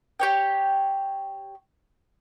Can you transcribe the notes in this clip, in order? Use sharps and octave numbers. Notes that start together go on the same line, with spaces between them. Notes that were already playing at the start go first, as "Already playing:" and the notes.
G4 C#5 G5